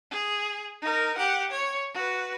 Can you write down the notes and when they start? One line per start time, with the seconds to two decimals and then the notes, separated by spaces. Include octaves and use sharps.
0.11 G#4
0.82 D#4 A#4
1.17 G4 F#5
1.51 C#5
1.94 F#4 B4